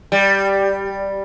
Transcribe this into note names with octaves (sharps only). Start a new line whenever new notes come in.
G3